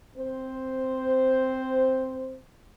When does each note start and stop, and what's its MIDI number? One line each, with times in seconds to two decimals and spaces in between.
0.16 2.38 60
0.16 2.38 72